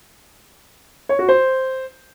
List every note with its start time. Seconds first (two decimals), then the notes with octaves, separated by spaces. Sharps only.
1.09 C#5
1.19 F#4
1.29 C5